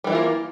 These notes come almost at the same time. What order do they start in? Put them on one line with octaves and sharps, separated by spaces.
G3 E3 E4 F4 A#3